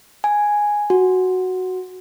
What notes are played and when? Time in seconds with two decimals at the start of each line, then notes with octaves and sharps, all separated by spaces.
0.24 G#5
0.90 F#4